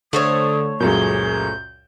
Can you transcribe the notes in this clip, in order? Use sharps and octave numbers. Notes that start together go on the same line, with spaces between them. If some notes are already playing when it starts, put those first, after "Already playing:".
D3 A3 C5 C#5 D#6
C#2 F#2 A#2 G#4 G6